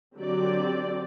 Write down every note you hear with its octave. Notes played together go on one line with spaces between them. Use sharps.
D3 F#3 C4 G4 D5